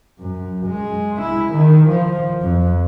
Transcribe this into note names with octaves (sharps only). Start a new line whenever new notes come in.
F#2
G#3
E4
D#3
F3
F2